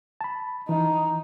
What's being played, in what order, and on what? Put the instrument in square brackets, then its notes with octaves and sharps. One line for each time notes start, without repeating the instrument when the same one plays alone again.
[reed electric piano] A5 B5
[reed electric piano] E3 [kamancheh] D#4